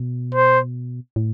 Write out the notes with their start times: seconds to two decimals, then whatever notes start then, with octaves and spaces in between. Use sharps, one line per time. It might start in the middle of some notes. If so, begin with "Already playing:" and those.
Already playing: B2
0.35 C5
1.16 A2